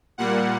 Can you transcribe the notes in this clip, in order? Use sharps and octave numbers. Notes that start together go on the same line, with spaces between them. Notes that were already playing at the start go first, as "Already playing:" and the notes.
A#2 G3 A#3 F#5